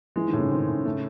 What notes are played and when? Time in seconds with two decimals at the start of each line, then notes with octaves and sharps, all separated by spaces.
0.16 E3 G#3
0.27 D#3
0.33 A2
0.39 C#3
0.50 D#3 C4
0.67 A2
0.85 C#3 A3